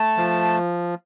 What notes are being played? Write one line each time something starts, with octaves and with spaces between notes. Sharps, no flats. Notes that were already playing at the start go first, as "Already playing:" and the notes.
Already playing: A3 A5
F3